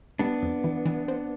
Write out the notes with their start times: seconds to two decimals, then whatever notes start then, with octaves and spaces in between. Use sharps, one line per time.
0.19 G3 B3 D4
0.43 F2
0.64 E3
0.86 E3
1.08 C4